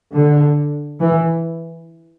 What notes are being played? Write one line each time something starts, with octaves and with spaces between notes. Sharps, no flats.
D3
E3